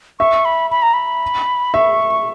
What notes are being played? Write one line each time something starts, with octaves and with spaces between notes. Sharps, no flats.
E5 C#6
B5
B5
A#5
B5
E5 C#6